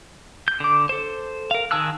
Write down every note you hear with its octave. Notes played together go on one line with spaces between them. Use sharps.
G6
D3 D6
A4 C5
A#4 F5
D#3 G#4 A5 E6 F#6